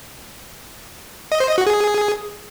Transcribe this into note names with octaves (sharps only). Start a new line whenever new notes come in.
D#5
C5
D#5
F#4
G#4